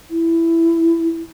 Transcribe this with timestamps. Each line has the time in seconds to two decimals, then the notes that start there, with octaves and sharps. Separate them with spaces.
0.10 E4